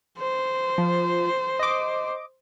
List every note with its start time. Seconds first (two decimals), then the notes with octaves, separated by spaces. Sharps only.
0.19 C5
0.78 F3
1.59 D#5 D6